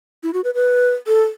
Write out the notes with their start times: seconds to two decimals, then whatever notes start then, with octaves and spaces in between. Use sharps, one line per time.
0.23 E4
0.34 F#4
0.44 B4
0.54 B4
1.07 A4